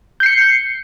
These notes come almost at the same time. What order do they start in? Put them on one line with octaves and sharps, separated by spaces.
G6 C7 C#7